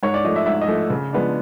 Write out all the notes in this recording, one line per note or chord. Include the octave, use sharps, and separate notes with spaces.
G#2 C#5
D5
F3 A3 D#5
E5
G#2 E5
D#5
F3 A3
C#3
F3 G#3 B3 D4